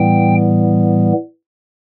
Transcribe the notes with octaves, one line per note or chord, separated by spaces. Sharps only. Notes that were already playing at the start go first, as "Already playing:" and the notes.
Already playing: A2 E3 G3 B3 G5